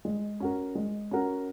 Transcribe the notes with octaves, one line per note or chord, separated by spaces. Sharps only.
G#3
C#4 F#4 A#4
G#3
C#4 F#4 A#4